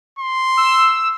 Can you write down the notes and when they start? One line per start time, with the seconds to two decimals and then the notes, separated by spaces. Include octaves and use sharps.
0.19 C6
0.57 E6